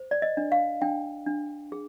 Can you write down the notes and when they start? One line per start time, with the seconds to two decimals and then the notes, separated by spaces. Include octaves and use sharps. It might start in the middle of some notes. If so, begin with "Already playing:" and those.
Already playing: C5
0.11 D5
0.22 D#5
0.37 D4
0.52 F5
0.82 D4 G5
1.27 D4
1.72 G#4